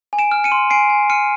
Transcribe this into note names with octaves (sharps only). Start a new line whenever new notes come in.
G#5
D7 E7
F6
C#7 D#7
C6
G#5 C7 D7
G#5
F6 C#7 D#7